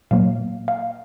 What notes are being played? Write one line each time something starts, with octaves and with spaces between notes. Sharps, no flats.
A#2 F#3 A#3 F5
F5